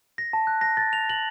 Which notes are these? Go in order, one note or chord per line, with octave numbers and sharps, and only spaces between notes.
A#6
A5
F#6
A#6
A6
F7
F#7